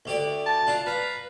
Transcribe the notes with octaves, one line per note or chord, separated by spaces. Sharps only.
D2 G4 D5
A5
D4 F4
B4 F5 A#5